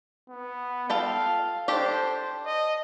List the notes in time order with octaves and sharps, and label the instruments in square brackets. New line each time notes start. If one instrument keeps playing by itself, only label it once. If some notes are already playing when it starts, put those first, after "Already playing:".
[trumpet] B3
[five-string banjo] F4 A4 G5 [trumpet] F5
[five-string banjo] D4 G4 A4 [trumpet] C5
[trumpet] D#5